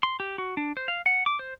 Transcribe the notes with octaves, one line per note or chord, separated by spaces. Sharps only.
C6
G4
F#4
D4
C5
F5
F#5
D6
C5